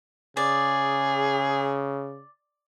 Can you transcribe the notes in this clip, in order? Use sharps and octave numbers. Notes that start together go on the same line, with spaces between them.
C#3 G#4 D5